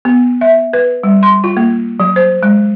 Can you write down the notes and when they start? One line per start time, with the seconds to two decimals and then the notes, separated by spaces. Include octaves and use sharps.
0.05 B3
0.41 E5
0.73 B4
1.03 G3
1.23 C6
1.44 F4
1.57 A#3
2.00 F#3
2.16 C5
2.43 G#3